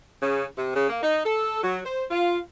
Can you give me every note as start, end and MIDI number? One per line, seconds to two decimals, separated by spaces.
0.21 0.44 49
0.56 0.74 48
0.75 0.88 49
0.89 1.00 58
1.02 1.24 63
1.24 1.62 69
1.63 1.79 54
1.84 2.04 72
2.09 2.39 65